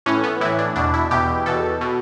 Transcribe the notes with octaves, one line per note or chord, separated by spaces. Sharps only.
A2 E3 C#4
B3
A2 E3 E4
D4
E2 B2 D4
E4
E2 B2 G4
E2 B2 A4
B2